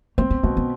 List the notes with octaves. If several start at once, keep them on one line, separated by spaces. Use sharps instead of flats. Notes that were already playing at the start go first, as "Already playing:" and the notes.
A#3 C4
B3
B2 A#3
B3